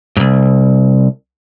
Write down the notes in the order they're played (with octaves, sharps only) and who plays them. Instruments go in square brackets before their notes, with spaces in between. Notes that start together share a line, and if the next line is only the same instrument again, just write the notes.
[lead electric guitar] C2 G#2